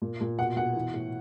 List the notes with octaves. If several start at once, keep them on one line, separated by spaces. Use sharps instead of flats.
A#2
A#2
B2 F#5
B2 F#5
E3
A2